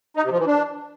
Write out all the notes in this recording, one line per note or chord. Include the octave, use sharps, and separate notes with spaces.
D#4
C3
F3
E3
D4